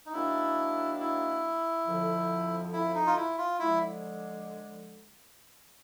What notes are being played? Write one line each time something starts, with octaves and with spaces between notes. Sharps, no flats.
D#4
D#3 F#3 A#3 D4 E4
E4
F2 D3 F3
E4
D#4
F4
E4
F4
D3 F3 G#3 E4